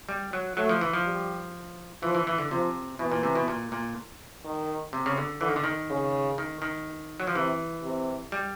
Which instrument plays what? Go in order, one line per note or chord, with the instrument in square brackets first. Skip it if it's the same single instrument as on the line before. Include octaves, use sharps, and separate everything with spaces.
[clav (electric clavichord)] G3
F#3
[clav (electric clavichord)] F#3 [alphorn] A3
[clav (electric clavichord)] F3
E3
F3
[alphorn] G3
[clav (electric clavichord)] E3 [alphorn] F3
[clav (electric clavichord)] E3
E3
D3
[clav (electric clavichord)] C3 [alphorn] F3
[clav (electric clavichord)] B2 [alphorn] E3
[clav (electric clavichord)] A#2
C3
B2
A#2
A#2
[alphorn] D#3
[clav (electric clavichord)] C3
C#3
D3
[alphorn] D3 [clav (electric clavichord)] E3
[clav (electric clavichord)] D#3
D3
D#3
[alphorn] C#3
[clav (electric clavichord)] D#3
D#3
F#3
F3
[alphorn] C3 [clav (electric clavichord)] E3
[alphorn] C3
[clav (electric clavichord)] G3